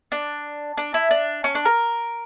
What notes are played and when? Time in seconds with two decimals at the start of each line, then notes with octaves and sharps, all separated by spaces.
0.12 D4
0.78 D4
0.94 E4
1.11 D4
1.44 C#4
1.55 D4
1.65 A#4